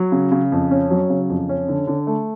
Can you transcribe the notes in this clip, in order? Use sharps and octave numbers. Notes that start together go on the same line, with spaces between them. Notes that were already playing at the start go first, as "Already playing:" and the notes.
Already playing: F#3
C#3
C#3
F2
C#4
F#3
C#3
F2
C#4
D3
D3
A3